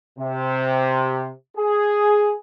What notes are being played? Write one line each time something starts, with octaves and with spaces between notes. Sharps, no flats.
C3
G#4